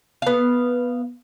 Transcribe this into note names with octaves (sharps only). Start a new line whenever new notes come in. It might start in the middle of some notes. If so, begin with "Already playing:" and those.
B3 F5